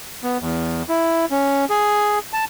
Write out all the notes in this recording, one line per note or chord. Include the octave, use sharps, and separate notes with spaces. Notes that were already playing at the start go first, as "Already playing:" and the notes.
B3
E2
E4
C#4
G#4
A5